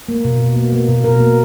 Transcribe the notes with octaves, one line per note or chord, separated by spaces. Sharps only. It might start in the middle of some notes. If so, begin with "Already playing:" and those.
A#3
B2
B2
A#3
A#3
B2
B2 A#4
A#3